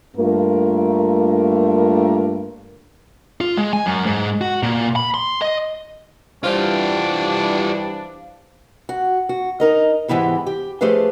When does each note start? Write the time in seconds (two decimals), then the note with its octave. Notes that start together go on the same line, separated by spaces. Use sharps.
0.17 G2 A3 A#3 F4 A#4
3.41 F4
3.57 G#3
3.73 G#5
3.86 F#2
4.06 G#2
4.41 F#4
4.63 A#2
4.96 B5
5.14 C6
5.42 D#5
6.44 G2 E3 G3 D4 F4 G4 C5 F5
8.89 F#4
9.29 F#4
9.60 D#4 A#4 D#5
10.08 G#2 E3 B3 E4 G4
10.46 G4
10.81 F3 A3 G4 G#4 B4 F5